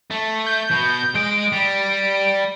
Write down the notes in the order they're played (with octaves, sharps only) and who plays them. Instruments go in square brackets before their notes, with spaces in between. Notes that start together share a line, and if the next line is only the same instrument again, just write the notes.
[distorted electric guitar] A3
[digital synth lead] G6
[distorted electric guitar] B2
[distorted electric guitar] G#3 D#5 [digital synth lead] D7
[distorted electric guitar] G3